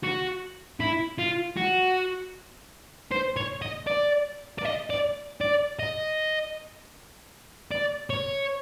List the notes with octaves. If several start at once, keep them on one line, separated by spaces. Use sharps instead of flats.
F#4
E4
F4
F#4
C5
C#5
D#5
D5
D5
D#5
D5
D5
D#5
D5
C#5